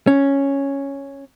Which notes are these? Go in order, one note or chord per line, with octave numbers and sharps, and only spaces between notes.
C#4